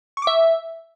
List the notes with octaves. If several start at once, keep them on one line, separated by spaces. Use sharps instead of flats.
C#6
D6
E5